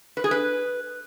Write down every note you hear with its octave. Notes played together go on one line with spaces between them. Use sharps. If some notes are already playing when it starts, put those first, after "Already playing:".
B4
G#4
B4